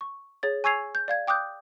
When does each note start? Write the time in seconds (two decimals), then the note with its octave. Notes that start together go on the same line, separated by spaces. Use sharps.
0.01 C#6
0.43 G#4 C#5 A6
0.64 G#5 C#6 E6 G#6 C7 F7
0.95 G6
1.08 D5 F5 G#6
1.27 G5 D6 D#6 F#6 G6